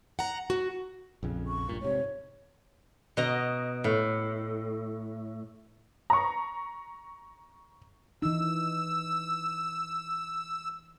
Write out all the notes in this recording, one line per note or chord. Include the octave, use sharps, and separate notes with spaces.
F#5 A#5
F#4
A#1 F2 C#3
C#6
A#1 G2 A#2
G#2 C3 C#5
B2 D#5 A#5
A2
A#5 C#6
E3 D#4 E6